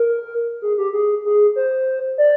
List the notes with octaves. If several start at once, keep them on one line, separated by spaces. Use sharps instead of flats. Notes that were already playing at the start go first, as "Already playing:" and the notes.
Already playing: A#4
G#4
G4
G#4
G#4
C5
D5